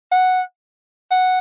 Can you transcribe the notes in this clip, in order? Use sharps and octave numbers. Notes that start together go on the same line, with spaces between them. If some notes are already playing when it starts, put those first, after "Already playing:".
F#5
F#5